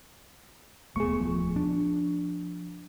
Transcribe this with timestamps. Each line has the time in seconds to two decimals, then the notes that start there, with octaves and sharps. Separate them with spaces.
0.96 D#1 A3 B3 G#4 C#6
1.21 F3
1.56 D4